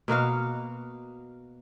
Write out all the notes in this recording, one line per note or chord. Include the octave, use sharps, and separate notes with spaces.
B2 A#3 F#4 F5